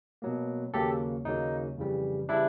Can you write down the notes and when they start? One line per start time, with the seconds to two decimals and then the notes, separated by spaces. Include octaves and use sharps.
0.22 B2 F#3 A#3
0.74 D#2 C#3 F#3 A#3 G4 A4
1.25 D#2 C#3 F#3 A#3 D#4
1.77 F2 C#3 E3 G3
2.29 C#3 E3 G3 D4 E4